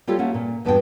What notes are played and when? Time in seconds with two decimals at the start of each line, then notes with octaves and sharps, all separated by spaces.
0.07 G3 F4 G4 A4 C#5
0.19 A3 A#3 C#4 F#5
0.34 A#2
0.65 E2 G2 B3 D4 F#4 G5